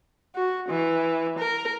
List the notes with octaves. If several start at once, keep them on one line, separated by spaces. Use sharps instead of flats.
F#4
E3
A#4